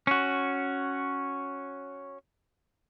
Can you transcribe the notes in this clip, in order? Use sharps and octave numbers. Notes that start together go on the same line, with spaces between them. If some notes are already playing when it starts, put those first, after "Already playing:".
C#4 F#4